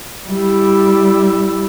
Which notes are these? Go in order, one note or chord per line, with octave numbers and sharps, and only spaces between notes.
G3 E4